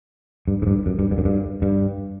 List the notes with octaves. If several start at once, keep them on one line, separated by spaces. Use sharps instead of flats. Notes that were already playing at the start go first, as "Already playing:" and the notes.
G2
G#2
G2
F#2
G2
G2
F#2
G2
G2